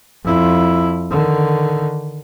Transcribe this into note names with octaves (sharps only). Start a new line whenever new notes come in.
F2 E4
D3 D#3